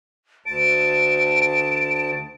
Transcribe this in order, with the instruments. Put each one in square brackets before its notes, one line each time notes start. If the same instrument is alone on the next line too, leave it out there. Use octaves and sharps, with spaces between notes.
[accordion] D2 A5 [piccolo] D7